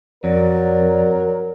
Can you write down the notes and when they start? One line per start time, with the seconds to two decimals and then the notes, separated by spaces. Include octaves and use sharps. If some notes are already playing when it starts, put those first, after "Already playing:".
0.24 F2 F#3 A#4 D5